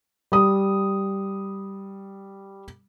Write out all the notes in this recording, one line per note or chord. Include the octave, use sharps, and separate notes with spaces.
G3 D#6